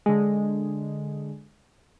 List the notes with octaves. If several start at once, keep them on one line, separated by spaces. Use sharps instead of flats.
D3 G#3